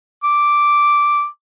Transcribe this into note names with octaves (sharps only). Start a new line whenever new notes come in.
D6